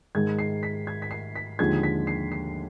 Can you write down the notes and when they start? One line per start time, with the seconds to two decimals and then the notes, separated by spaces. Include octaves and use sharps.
0.15 G#2 D#3 G#3 G#6
0.39 C7
0.63 B6
0.87 G#6
1.02 B6
1.11 C7
1.36 B6
1.59 D#2 D3 F3 G#3 G#6
1.83 B6
2.07 C7
2.32 C7